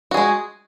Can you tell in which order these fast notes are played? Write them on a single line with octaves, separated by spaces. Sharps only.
F#4 G#4 G#3